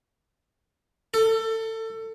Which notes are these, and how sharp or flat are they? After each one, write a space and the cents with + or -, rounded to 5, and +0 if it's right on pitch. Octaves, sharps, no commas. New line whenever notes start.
A4 +25